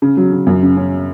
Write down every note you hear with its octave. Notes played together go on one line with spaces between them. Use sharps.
C#3
F#3
C#3
F#2
C#3
C#4